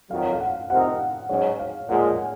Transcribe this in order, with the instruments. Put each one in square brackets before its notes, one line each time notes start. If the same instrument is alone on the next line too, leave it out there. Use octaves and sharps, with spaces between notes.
[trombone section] F2 D#3 F#3 [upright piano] F5
[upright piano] F5
F#5
[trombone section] C3 F3 C4 D#4 A#4 [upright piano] F#5
[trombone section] G#2 F#3 C#4 [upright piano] C#5
[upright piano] F5
[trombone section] A#2 F3 G#3 [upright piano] F#5
[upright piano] G#5